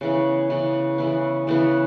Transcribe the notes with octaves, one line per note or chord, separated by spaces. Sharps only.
C#3 E3 B3
C#3 E3 B3
C#3 E3 B3
C#3 E3 B3